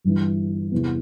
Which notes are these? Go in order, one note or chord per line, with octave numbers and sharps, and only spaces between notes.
G1 G2 E3
E2 C3 E3 B3